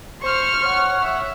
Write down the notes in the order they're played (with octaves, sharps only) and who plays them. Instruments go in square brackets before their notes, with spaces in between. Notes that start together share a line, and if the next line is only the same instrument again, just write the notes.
[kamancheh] C5 [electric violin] C#6 F6
[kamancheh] C#5 F#5
[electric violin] E5